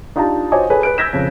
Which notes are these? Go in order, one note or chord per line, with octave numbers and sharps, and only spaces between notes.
D4 D#4 F4 G4 A5 A#5
F#4 C5 C#5 D#5 G#5 D6
G#4 A4 B4 C#5 G#5
B4 F#6 D7
E6 G6 G#6 A#6 B6 E7
F2 C#3